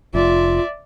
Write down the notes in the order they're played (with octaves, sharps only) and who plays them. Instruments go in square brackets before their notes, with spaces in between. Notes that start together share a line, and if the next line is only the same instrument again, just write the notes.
[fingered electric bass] F1 [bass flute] F4 [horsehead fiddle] D5 E5